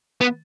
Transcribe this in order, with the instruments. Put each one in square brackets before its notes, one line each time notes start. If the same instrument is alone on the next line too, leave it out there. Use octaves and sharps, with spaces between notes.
[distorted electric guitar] B3